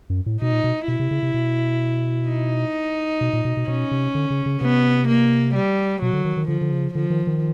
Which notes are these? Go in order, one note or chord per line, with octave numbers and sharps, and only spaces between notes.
F#2
A2
B2 D#4
A#2
B2
B2 E4
C3
C#3
C3
B2
D#4
B2
A#2
B2
B2
B2 C#4
C3
D3
C#3
C#3
C3 B3
A#3
G3
B2 F#3
D3
D#3
D#3
D3 F3
D3
C#3
D3 F3
D#3
D#3